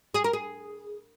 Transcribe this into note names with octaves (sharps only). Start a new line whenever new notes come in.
G#4
A#4
G#4